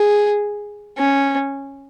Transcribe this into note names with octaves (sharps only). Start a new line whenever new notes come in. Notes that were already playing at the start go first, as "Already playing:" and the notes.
Already playing: G#4
C#4